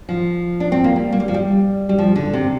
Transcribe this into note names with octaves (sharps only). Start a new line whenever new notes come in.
F3
D4
C4
A#3
G3
A#3
G3
F3
G3
G3
F3
D3
C3